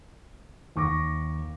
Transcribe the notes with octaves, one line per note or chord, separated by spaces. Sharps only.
D#2 C#6 D6 A#6